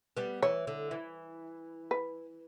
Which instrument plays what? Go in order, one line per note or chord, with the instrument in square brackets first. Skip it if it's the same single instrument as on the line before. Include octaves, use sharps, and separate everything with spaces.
[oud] G3 B3
[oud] E3 [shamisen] C#5
[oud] D3
E3
[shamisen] B4